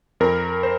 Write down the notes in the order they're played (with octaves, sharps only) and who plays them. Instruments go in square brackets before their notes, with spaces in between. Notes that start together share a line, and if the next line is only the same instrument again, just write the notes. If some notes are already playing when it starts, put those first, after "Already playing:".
[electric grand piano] F2 A#4
C5